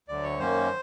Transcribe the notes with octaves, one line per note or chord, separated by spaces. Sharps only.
D2 D3 F#3 D5
C#5
F#2 D#3 F#3 A#3 C#4 C5